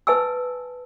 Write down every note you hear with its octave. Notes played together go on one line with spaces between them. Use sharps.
B4 D#5 G#5 A5 E6